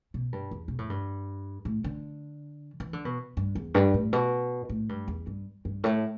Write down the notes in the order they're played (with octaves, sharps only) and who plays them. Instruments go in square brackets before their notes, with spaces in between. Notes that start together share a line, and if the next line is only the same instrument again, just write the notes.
[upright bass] B2
G2
E2
B2
A2
G2
A2
D3
E3
D3
B2
G2
E2
G2
A2
B2
A2
G2
E2
G2
G2
A2